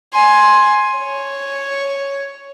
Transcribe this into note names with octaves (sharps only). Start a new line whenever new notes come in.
G#5 C6
C#5